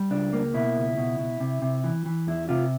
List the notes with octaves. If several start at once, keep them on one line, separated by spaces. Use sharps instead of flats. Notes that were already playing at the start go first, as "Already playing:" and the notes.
Already playing: G3
C#2 D4
A#3
B2 E4
C#2
B2
B2
C3
C3
E3
E3
E2 E4
C3 F4